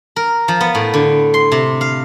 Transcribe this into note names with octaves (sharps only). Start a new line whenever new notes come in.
A#4
F3
B3
A2
D3
C6
C3
F5